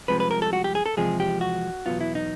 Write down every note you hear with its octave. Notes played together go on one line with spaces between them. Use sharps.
C2 C3 F3 G#3 B4
B4
A#4
A4
F#4
G4
G#4
A4
E2 C3 F3 G#3 G#4
G4
F#4
E2 B2 F#3 B3 F4
E4
D#4